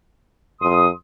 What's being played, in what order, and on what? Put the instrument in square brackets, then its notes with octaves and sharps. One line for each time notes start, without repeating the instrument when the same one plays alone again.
[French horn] F2 [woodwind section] C6 D#6